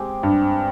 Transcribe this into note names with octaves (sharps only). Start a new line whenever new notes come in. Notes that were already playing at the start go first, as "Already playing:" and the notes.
Already playing: G#3 C4 G4
G2